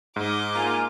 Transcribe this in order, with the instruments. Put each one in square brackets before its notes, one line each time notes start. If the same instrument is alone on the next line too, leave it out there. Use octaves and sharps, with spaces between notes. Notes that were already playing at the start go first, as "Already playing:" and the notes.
[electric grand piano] G#2 [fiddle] D#5 D6
[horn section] A#3 F4 [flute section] G#5